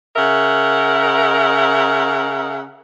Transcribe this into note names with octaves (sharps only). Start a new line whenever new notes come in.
C#3 A#4 E5 F#5